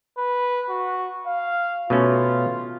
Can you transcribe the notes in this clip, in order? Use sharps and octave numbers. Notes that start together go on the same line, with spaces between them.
B4
F#4
F5
B2 A3 C#4 F4